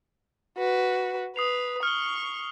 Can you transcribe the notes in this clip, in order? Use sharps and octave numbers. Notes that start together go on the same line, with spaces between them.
F#4 B4
B4 D#6 C7 F7
C#6 F6 G7